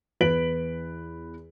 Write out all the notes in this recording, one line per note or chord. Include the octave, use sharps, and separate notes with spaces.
E2 B4 B6 D7 F#7